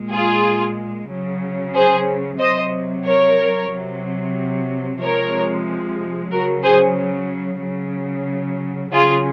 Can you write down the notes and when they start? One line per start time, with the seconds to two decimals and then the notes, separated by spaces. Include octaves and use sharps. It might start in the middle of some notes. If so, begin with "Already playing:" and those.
Already playing: A#2 G#3
0.12 F4 G#4
1.10 C#3 F#3
1.75 G#4 C5
2.40 C3 F#3 C5 D#5
3.05 A#4 C#5
3.70 C3 F#3
5.01 C3 F3 G#3 A#4 C#5
6.31 C#3 F#3 F#4 A#4
6.64 G#4 C5
7.61 C#3 F#3
8.92 C#3 F#3 F4 G#4